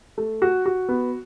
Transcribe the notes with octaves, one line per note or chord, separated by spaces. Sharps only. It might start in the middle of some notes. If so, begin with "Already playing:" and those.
A3
F#4
F#4
B3